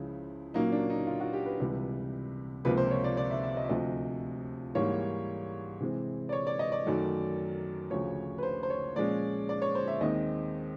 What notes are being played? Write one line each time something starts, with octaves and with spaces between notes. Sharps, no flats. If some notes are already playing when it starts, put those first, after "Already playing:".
Already playing: C#2 C#3 F3 E4
A#2 F#3 A#3 C#4 D#4
D4
D#4
F4
F#4
G4
B4
C#2 C3 E3 G3
C#2 C3 F3 A#3 B4
C5
C#5
D5
D5
E5
E5
D#5
E5
D2 C3 F3 D#5
G#2 E3 G3 A#3 C#5
C3 E3 G#3 C4
D5
C#5
D5
D#5
D5
F#2 D#3 F#3 A3
D2 C#3 F3 C#5
B4
C5
C5
C#5
A#2 F3 G#3 C#4 D5
D5
C#5
C5
E5
D#2 D#3 G#3 C4 D#5